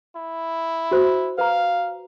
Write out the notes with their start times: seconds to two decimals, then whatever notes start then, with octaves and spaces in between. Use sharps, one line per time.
0.16 E4
0.91 F#4 C5
1.38 B4 F5 A#5